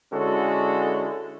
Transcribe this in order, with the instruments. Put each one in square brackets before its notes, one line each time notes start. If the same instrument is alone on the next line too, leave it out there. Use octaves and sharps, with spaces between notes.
[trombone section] D3 G#3 C#4 E4 F#4 A4